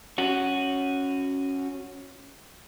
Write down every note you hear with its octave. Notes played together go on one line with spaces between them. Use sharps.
C#4 F#4